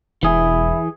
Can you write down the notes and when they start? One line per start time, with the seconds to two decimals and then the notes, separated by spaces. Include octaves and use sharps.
0.23 E1 E3 E4 G#4